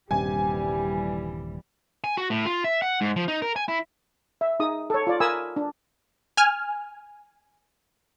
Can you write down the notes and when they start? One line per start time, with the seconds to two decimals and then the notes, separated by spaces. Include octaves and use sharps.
0.11 D#1 G2 C3 E3 G3 G4 G#5
2.04 G#5
2.17 F#4
2.30 A2
2.46 F4
2.64 E5
2.82 F#5
3.01 G#2
3.16 F3
3.28 D#4
3.42 A#4
3.56 G#5
3.68 E4
4.41 E5
4.60 D#4 G#4 D#6
4.90 A4 C#5
5.07 F4 D5
5.20 A#4 G#5 B5 D#6 E6
5.56 D4
6.37 G#5 F6